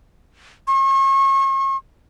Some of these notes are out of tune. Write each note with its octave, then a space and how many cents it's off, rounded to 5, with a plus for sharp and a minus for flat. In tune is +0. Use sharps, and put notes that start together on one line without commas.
C#6 -40